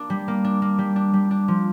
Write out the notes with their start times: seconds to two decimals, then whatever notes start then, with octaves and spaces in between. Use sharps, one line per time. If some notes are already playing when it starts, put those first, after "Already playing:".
Already playing: A#3 D4
0.10 G3
0.28 A#3
0.44 D4
0.62 A#3
0.79 G3
0.96 D4
1.14 G3
1.31 D4
1.48 F3